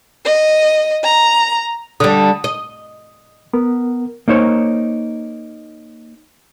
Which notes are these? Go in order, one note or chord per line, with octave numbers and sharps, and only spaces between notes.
D#5
A#5
D3 G3 D#6
D#5
B3 A#4
A#3 D#4 C5 C#5